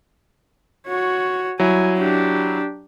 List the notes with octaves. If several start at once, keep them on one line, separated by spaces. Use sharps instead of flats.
F#4 C#5
F#3 G3 E4 G#5
D4 G4